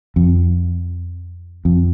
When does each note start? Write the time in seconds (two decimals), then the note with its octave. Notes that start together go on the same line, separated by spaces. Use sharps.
0.16 F2
1.65 F2